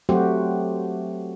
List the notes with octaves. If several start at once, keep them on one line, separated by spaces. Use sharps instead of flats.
F#3 A3 C4 F#4 G4 C5